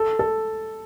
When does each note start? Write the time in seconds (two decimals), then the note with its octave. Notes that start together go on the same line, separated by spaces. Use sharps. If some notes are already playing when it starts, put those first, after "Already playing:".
Already playing: A4
0.19 A4